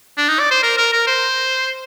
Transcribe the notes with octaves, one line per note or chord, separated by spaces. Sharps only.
D4
D#4
D5
C5
A#4
A#4
A#4
C5